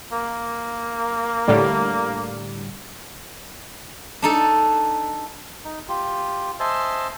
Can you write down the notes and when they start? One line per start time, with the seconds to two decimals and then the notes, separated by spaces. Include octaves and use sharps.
0.12 A#3
1.48 A2 D3 G3
4.22 D4 D#4 A4
5.65 D#4
5.89 F4 G4
6.60 C5 D#5 E5 G#5 A5 C6